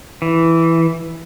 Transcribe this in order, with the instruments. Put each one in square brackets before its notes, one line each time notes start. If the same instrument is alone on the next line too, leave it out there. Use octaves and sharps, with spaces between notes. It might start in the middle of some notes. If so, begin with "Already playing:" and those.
[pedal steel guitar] E3